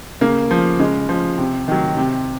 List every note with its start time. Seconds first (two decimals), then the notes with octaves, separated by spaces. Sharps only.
0.21 C#3 A#3
0.51 F3
0.80 C#3 G#3
1.09 F3
1.38 C3
1.68 D#3 F#3
1.97 C3